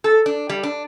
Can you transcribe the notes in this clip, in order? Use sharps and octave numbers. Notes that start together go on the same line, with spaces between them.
A4
D4
G3
D4